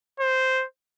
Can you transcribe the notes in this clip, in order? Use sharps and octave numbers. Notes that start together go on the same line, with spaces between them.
C5